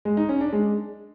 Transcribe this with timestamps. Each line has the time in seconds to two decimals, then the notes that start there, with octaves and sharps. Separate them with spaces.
0.05 G#3
0.17 D#4
0.29 C#4
0.41 D4
0.53 G#3